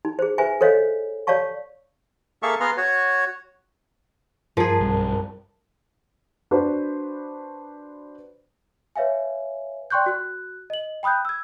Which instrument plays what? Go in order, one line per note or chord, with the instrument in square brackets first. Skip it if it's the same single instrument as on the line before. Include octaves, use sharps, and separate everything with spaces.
[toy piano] D#4
G#4 C5
B4 C5 E5 G#5
A4 C5 C#5 D#5 F5
C#5 D5 F5 A5 C#6
[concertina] A#3 G#4 A4 E5 F5 C#6
B3 G#4 F5 A#5 C6 F6
F#4 C#5
[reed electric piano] G2 A#4 A5 [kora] F3 G#4
[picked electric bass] B1 G3
[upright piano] D4 F#4 B4 C5
[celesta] B4 C#5 E5 F5 G#5
D5 G5 C6 C#6 F#6 G6
F#4 F#6
D#5 F#7
G5 B5 D#6 F#6 G6
E6 G#6